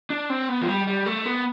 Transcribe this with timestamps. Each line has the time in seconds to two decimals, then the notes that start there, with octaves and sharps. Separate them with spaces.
0.10 D4
0.30 C4
0.49 B3
0.62 F3
0.68 G3
0.87 G3
1.06 A3
1.25 B3